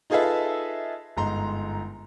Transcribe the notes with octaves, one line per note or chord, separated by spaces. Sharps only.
D#4 F4 G#4 A4 B4 E5
G1 G#2 A#5 C6